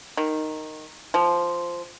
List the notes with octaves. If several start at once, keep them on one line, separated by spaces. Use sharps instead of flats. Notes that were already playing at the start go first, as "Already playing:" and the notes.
D#3
F3